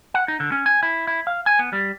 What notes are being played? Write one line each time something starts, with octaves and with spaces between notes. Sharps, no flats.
F#5
D#4
D3
C#4
G#5
E4
E4
F5
G#5
B3
G3